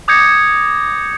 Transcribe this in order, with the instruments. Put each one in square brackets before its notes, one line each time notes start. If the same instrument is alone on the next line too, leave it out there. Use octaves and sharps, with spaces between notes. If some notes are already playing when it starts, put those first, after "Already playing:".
[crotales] D6 D#6 G6 G#6 A#6 C#7